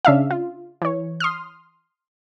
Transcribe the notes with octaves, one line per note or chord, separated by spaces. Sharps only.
C#3 D4 E5 F5
F4
E3 C#5
C6 D#6 F6